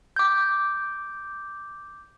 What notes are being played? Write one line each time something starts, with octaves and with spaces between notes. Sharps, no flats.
D6 G6